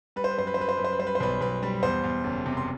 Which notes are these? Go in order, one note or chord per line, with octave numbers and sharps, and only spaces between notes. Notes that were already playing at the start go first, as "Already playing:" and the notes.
G3 B4
C5
B4
F#2 C5
B4
C5
F#2 B4
C5
F#2 B4
C5
B4
G3 C5
B4
C5
B1 B4
B1 B4
G3
E2 C5
E2
F#1
C3
C6